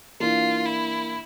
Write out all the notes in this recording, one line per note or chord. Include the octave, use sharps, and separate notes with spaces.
E3 A#3 D4 F4
E4